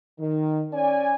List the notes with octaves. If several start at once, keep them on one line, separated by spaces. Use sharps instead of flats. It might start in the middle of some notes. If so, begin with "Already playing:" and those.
D#3
C#4 D5 G#5